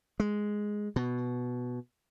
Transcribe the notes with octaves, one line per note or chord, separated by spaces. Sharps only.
G#3
B2